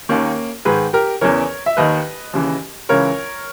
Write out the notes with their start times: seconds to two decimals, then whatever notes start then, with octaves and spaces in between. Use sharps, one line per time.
0.09 D#2 D#3 A#3 C#4
0.65 G#2 D#3 G#4 B4
0.93 G4 A#4
1.21 E2 C#3 E3 A#4 C#5
1.66 E5
1.77 D#2 D#3 B4 D#5
2.33 D#2 C#3 E3
2.89 C#2 C#3 E3 A#4 C#5